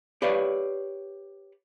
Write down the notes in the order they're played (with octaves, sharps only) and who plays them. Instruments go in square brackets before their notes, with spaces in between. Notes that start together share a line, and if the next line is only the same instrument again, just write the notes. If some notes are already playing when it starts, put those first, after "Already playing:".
[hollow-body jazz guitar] G4 B4 C#5 D5 F5